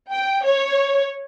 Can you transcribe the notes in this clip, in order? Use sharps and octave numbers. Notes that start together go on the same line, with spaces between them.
G5
C#5